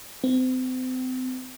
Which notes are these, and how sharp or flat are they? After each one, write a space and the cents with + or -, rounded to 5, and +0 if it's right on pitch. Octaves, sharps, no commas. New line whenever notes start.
C4 -35